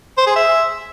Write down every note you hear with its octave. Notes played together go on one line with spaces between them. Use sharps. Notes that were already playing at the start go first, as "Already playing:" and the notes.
C5
G#4
E5